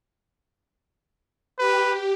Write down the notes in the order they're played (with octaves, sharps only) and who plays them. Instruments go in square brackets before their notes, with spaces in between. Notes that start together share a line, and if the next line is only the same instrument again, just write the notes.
[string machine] G4 [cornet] B4